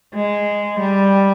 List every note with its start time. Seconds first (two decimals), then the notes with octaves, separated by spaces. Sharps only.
0.15 G#3
0.79 G3